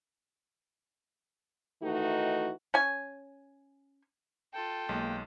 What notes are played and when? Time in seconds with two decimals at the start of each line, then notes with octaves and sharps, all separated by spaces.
1.82 D#3 E3 A3 D#4 F#4
2.74 C#4 G#5
4.53 F4 A4 G5
4.89 B1 G#3 A#3